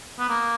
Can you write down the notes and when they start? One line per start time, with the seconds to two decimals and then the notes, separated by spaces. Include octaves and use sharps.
0.19 B3
0.29 A#3